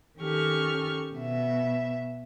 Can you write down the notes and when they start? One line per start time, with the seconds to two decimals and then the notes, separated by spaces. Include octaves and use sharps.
0.19 D#3 C#4 G4 A4 C#6 F6
1.15 B2 E5